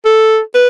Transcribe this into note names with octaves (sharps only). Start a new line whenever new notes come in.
A4
B4